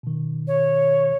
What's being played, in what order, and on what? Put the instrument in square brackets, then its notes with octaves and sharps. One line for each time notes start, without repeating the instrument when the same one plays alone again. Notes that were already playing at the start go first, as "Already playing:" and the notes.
[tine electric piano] B2 D#3
[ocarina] C#5